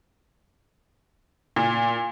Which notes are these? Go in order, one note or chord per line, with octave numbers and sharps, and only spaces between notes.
A#2